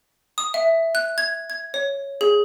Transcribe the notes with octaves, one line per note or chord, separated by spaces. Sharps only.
D#6
E5
F#6
G#6
G#6
C#5
G#4